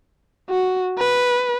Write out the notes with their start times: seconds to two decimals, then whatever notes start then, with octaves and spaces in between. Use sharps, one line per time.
0.50 F#4
0.98 B4